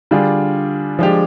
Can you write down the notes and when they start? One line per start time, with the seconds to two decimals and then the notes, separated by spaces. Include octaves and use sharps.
0.11 D3 G3 D4 F4 G#4
0.99 F3 G#3 D4 G4